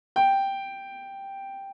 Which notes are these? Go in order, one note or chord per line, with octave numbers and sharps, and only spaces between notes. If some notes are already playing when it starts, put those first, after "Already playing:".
G5